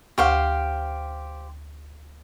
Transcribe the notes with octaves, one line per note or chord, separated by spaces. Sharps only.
D2 G4 C5 F5 F#5 C#6